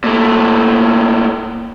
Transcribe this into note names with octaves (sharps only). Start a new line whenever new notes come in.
A#2 A3